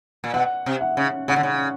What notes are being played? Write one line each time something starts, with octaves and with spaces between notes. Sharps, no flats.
A#2
B2 F#5
C3
F#5
C#3
C#3 F#5
D3
C#3